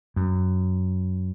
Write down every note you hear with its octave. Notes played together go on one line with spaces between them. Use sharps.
F#2